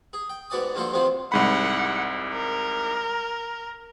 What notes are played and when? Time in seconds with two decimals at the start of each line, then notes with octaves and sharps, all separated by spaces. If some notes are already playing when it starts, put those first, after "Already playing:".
0.13 G#4
0.30 G5
0.50 G#2 B2 F#4 D5 G#5 D#6
0.75 G2 F3 A#3 F#4 A4 C5
0.93 C3 D#3 F3 F#3 C4 F4
1.32 C2 G#2 F#5 B5
2.32 A#4